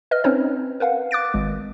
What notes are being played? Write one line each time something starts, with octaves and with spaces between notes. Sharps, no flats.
B4 D#5 F6
C4 C#4 D#4 C5 C#5
A#4 B4 F5 F#5
D6 F#6 A6 D7
G#1 G#3